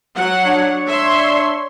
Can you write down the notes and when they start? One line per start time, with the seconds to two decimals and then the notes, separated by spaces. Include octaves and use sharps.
0.16 F#3 F#5
0.45 D4 C#5
0.88 E5 C6